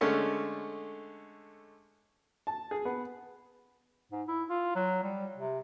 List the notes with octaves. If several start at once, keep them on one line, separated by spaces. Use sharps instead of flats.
D3 G#3 A3 C#4
A5
G#4
B3
G#2
E4
F4
F#3
G3
C3